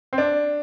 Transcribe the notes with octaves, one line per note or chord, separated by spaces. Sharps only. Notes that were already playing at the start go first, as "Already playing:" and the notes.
C4
D4